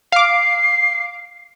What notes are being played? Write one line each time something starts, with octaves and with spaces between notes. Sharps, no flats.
F5 D6 C7